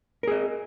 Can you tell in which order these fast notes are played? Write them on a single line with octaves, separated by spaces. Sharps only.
A#4 G#4 D#5